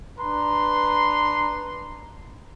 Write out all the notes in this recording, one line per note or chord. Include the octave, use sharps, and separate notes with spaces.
D4 B4 A#5 C6